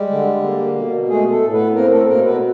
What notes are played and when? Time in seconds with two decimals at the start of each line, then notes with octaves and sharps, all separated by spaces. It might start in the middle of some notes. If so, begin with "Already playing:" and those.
Already playing: G3 G#3 G4
0.10 D3
0.43 A#3
0.75 B2
1.08 G#3 A3 G#4
1.31 A3 A4
1.42 A2
1.53 B3 B4
1.75 A#3 C4 A#4
1.92 A3 A4
2.08 B2 A#3 A#4
2.25 B3 B4